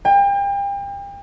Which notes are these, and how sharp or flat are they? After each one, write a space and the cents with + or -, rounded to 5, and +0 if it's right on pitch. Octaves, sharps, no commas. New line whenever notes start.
G5 +35